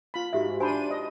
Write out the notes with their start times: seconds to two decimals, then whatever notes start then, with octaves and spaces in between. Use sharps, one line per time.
0.14 F4 B5
0.33 G#2 F#4 G4 E5
0.60 D4 C5 G#5 A5 B5 D#7
0.91 D#5